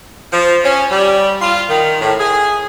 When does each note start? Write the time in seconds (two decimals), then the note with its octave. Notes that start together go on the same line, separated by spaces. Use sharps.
0.32 F3
0.64 C#4
0.91 G3
1.41 F4
1.69 D#3
2.01 A2
2.20 G#4